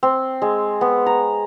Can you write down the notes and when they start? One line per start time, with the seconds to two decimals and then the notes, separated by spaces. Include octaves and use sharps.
0.03 C4
0.42 G#3
0.81 B3
1.06 A#5